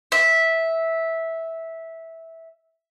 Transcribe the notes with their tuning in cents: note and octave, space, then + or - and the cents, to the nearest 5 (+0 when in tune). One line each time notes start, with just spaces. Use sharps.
E5 -10